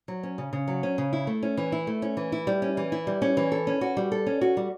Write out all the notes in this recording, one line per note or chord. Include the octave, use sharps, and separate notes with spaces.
F#3
C#4
C#3
C#3
F#3
C#4
C#3
E4
A3
C#4
E3
E4
A3
C#4
E3
E4
G3
C#4
E3
E4
G3
C#4
E3
A4
C#4
F#4
G3
A4
C#4
F#4
G3